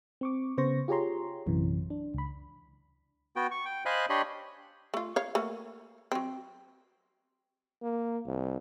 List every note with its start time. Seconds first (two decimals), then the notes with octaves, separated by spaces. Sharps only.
0.21 C4 C#6 D6
0.58 C#3 B3 C5 C#6 A#6
0.88 F4 G4 G#4 C#5 A#5 C6
1.46 A#1 F#2 C3 E3
1.90 D4
2.14 C#2 B5
3.36 B3 F#4 G5
3.51 C#6
3.65 G5
3.86 C5 D#5 F5 G#5 B5 F#6
4.10 D4 G4 C#5 D#5 B5 C6
4.94 A3 F4
5.16 C#5 F5
5.35 A3 A#3 F#4
6.12 F#3 C4
7.83 A#3
8.26 C2